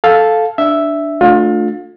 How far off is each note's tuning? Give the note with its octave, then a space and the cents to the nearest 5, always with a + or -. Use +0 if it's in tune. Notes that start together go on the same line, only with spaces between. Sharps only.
A4 -5 F5 +0
D4 +0 E5 +0
A3 +0 D4 +0 F4 +30